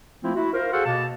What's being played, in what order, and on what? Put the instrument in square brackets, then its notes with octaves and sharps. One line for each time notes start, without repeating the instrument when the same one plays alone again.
[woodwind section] F3 A3 A#3 C4 E4 F4
E4 F#4
F4 A#4 C5
F#4 G#4 A4 C5 F5 F#5
B2 A#3 A5